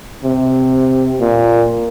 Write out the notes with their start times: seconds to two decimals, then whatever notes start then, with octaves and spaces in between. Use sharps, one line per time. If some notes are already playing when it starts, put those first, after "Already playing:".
0.24 C3
1.20 A#2